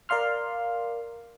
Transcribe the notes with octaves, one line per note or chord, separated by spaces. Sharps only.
A#4 D5 F5 C6 F6